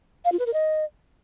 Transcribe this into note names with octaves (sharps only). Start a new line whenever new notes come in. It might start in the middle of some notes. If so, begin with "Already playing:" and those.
F5
F4
B4
A#4
D#5